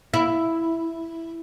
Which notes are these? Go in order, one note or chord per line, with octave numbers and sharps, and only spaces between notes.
E4